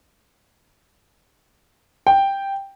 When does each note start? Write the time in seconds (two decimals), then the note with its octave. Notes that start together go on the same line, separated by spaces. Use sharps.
2.07 G5